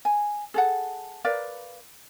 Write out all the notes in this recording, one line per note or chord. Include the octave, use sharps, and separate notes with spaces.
G#5
G#4 A4 F#5
A#4 B4 D5 F5